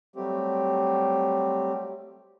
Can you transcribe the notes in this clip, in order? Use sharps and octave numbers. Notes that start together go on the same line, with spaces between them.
F#3 G3 A3 C4 G4